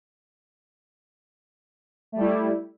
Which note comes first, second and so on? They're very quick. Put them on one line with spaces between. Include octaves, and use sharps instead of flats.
A3 G3 E4